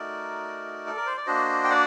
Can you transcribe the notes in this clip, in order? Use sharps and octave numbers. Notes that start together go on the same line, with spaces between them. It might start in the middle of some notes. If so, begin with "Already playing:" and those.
Already playing: A3 D#4 F#4 A#4 D5
A4
A#4
C5
D5
A#3 D4 F#4 C5 D#5
G5
D5 F#5